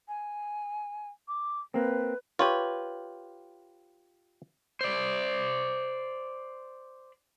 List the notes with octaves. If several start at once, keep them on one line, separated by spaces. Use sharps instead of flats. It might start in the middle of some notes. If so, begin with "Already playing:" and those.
G#5
D6
A#3 C4 B4
F4 G4 B4 C#5
C5 D5